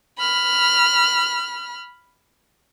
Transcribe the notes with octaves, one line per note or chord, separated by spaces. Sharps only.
B5 F6